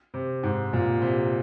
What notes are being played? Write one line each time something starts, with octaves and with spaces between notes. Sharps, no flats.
C3
G#2
A#2
C3